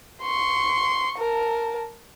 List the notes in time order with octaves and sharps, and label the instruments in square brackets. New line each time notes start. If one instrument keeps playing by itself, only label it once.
[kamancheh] C6 C#6
A#4 A5